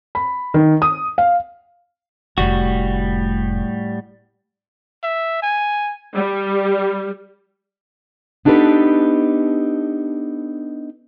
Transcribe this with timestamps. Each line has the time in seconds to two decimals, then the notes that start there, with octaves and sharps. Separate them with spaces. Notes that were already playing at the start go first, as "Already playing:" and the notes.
0.15 B5
0.54 D#3
0.82 D#6
1.18 F5
2.38 F1 A2 G3 F#4
5.03 E5
5.42 G#5
6.16 G3
8.45 B3 D4 D#4 G4 A4 B4